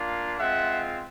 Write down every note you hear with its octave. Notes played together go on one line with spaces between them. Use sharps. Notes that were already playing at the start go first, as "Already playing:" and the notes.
Already playing: A#3 D4 F4
G#3 C4 F4 E5 F#5